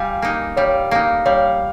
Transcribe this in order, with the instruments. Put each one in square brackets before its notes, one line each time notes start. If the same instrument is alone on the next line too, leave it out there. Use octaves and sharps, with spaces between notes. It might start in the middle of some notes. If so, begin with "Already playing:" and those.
Already playing: [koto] G3 [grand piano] F5 G#5
[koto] A#3 D#4
[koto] G3 [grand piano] C#5 F5
[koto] A#3 D#4
[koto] G3 [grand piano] C#5 F5